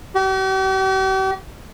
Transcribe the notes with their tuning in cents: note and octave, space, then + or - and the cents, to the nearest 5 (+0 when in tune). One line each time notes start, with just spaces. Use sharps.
G4 -45